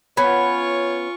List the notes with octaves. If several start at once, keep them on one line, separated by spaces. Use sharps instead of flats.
B3 C#4 F4 C#5 G#5 B5 C#6